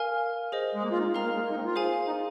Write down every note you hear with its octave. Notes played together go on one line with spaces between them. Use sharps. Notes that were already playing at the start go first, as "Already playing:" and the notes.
Already playing: A#4 F5 G#5 F6
G#4 C5 D#5
G#3
A#3
F4
D#4
C4 A#4 F5 A#5 F6
A#3
G#3
A#3
D#4
C4
F4
G#4 C5 F5 G#5
D#4